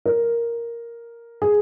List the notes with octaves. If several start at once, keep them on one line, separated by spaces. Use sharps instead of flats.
A#4
G#4